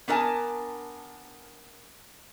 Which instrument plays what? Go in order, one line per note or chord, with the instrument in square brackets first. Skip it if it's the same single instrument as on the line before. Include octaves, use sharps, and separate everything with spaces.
[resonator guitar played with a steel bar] B3 D4 A#4 D#5 G#5 A5